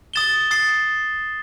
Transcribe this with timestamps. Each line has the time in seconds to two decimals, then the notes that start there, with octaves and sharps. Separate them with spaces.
0.14 D#6 A6 E7 G7
0.51 D#6 A6 C7